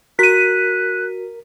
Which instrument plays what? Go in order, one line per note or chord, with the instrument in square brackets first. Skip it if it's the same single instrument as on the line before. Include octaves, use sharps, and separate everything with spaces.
[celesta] F#4 [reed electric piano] A#4 [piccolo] F#6 [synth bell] B6 D#7